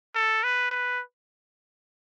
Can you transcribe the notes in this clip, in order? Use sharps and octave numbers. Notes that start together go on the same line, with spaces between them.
A4
B4
B4